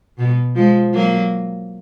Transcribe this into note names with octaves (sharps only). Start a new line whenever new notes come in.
B2
F3 G#3
F#3 A#3